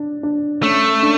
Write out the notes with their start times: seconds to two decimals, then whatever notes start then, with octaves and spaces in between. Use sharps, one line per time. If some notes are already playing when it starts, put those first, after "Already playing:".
Already playing: D4
0.23 D4
0.63 A3 C#4
1.03 D4